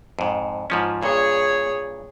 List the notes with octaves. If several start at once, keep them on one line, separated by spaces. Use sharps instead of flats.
F2 G#2
G#2 F3 C#4
G2 A#2 G#4 C#5